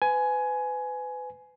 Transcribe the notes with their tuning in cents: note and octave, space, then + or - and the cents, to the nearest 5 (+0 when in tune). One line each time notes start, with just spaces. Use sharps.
B4 +30 G#5 +15